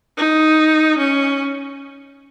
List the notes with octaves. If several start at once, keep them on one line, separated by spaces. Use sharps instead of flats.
D#4
C#4